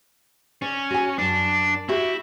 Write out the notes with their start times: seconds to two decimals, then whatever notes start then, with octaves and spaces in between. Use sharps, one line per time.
0.62 C#4 D5
0.91 F#4 G#5
1.19 F#2 D4 A5
1.89 E4 F#4 G4 E5